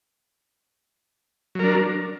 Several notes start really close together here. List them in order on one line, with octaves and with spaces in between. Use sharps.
F#3 A#4 D4